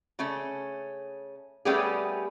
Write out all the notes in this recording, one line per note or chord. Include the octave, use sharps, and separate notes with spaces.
C#3 A3 C#4
G3 A3 B3 C#4 G4 G#4